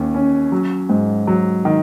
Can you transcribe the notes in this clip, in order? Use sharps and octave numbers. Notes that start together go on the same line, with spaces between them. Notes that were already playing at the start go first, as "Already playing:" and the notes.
Already playing: D#2 C#4
C#4
F#3
G#2
F#3
D#3